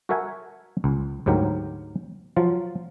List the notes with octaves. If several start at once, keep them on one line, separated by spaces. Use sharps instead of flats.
F#4 A4 A#4 E5 F#5 G#5
C#2
D2 G#2 F#3 G4 A#4
F3 F#3 F4